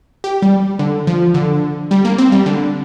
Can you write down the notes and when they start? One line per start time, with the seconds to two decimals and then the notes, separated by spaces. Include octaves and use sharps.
0.24 G4
0.42 G3
0.79 D3
1.07 F3
1.34 D3
1.91 G3
2.05 A#3
2.18 C4
2.32 G3
2.46 D3